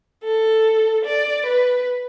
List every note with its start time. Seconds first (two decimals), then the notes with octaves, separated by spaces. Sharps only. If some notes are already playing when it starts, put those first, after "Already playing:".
0.24 A4
1.05 D5
1.46 B4